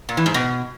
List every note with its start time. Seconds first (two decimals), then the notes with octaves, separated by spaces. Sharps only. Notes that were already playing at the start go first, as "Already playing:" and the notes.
0.09 A#2
0.17 E3
0.26 G#2
0.34 B2